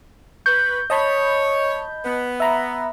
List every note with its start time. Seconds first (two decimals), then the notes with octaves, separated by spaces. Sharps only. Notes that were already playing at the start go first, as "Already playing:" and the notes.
0.46 B4 C#6 G6
0.90 C#5 D#5 A5 B5
2.05 B3
2.40 E5 A#5 B5